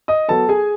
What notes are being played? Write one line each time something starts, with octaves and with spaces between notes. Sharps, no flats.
D#5 D#6
F#3 B3 A4 A5
G#4 G#5